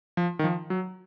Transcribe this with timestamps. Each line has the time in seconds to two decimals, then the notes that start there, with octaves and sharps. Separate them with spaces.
0.17 F3
0.39 D#3
0.44 F3
0.70 F#3